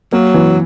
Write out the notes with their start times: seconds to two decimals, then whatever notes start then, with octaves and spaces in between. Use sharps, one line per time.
0.13 F#3 A#3
0.34 E3